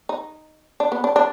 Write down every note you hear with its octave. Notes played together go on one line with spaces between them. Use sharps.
D#4
D4
B3
D4
D4